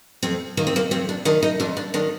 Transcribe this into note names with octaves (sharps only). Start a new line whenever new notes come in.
F2 C4
D#3 A#3
C4
A#3
F2 C4
D4
D#3 D4
D#4
F2 D4
D4
D#3 D4